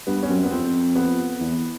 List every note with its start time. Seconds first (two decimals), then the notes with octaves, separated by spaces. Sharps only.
0.07 G2 B3
0.23 C#4
0.29 F#2 C4
0.44 B3
0.51 F2 C4
0.96 B3
1.40 E2